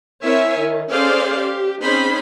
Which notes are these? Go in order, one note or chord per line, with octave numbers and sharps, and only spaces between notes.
C4 E4 A#4 C#5 E5 G#5
D#3
C#4 G#4 A4 C5 D5 F5
G4
C4 C#4 D#4 G#4 C5 B5